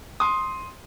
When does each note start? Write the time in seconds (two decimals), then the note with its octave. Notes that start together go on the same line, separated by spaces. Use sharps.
0.20 C6 D#6